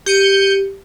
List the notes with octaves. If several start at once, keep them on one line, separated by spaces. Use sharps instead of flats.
G4 G6 C#7 D#7